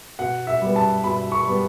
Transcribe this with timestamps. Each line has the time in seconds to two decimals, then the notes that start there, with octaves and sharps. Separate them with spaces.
0.19 B2 F#5
0.47 E5
0.62 G3 B3
0.76 A5
1.04 B2 B5
1.32 C#6
1.47 G3 B3